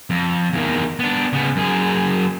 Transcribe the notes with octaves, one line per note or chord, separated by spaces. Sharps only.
F2
E2 D#3
B3 D4
C#3 B3
F#2 G#4